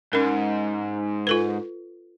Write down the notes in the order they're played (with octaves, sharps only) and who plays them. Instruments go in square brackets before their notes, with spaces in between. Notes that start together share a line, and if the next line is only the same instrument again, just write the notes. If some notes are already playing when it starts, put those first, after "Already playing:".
[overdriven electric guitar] G#2 [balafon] C#4 A#4
[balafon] F4 A4 B4